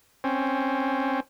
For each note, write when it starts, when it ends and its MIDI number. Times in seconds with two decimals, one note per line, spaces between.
0.24 1.20 60
0.24 1.20 61